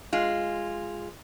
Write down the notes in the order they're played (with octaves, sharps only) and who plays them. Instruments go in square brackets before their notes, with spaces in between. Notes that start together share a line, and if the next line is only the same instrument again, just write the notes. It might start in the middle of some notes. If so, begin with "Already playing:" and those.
[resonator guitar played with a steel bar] G#3 F4